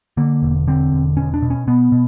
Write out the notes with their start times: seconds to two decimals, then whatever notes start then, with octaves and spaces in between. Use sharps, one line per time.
0.17 D3 A#3
0.42 E1
0.68 D3 C4
0.92 E1
1.17 B2 C#4
1.34 D4
1.42 B2
1.50 C#4
1.67 B2 B3
1.92 B2